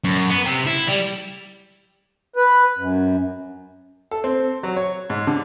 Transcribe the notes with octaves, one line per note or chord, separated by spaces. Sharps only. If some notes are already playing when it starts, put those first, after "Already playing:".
F#2
B3
C3
E4
G3
B4
F#2
A4
C4
F#3
C#5
G#2
D3